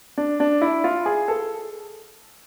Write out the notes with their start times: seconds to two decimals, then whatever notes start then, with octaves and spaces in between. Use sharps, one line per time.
0.18 D4
0.40 D4
0.61 E4
0.84 F4
1.06 G#4
1.28 A4